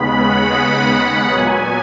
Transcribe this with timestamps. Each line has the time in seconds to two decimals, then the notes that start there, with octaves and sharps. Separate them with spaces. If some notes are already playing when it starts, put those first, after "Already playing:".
Already playing: D#2 C#3 G#3 B3 B5
0.26 F#5
0.62 F#5
1.32 A#2 F#3 B3 G#5